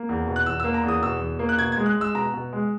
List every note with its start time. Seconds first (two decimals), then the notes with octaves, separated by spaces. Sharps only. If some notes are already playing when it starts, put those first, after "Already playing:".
Already playing: A#3
0.09 E2
0.27 B2
0.36 F#6
0.46 E2 E6
0.60 E6
0.64 A#3
0.74 A#5
0.84 E2 D#6
1.02 B2 E6
1.20 E2
1.39 A#3
1.49 F#6
1.58 B2 G#6
1.72 G#6
1.77 G#3
1.86 F#6
1.96 G#3 E6
2.15 B2 A#5
2.34 B2
2.53 G#3